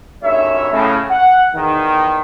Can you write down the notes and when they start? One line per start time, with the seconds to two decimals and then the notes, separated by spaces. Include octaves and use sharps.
0.22 G1 F#2 D#4 C#5 E5
0.71 A2 C#3
1.10 F#5
1.54 E2 D#3